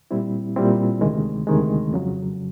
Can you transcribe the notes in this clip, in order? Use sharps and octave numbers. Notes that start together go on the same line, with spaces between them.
A#2 G3 C4 E4
A#2 G3 C4 E4
D2 C3 D#3 G#3
D2 C3 D#3 G#3
F2 C#3 F#3